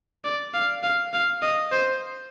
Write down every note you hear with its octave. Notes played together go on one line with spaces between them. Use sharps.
D5
F5
F5
F5
D#5
C5